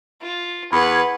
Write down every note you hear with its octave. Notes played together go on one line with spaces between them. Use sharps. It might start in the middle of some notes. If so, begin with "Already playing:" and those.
F4
E2 B4 F#5 B5 G#6